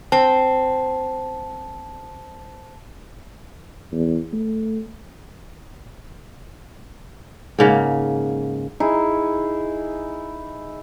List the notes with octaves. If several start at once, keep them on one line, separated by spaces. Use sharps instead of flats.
C4 A5
E2
A3
G#2 C#3 A#3
D#4 E4 G#4